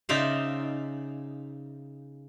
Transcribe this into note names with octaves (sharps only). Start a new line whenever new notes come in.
C#3 D#4 C5 D5 E5 F5